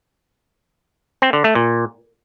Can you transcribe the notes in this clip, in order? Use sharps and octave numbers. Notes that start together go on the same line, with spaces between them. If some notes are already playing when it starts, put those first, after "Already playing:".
C4
D3
A3
A#2